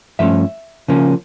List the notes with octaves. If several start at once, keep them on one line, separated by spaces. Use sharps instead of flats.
G2 F3 A3 C#4 E5
C#3 F3 A#3 C#4